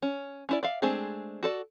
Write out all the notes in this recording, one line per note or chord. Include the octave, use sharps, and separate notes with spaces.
C#4
C#4 E4 D5
D5 E5 F5
G#3 A3 C4 D4 G#4
F#4 A4 D5